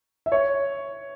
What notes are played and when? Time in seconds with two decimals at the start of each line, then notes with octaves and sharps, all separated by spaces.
0.26 E5
0.32 C#5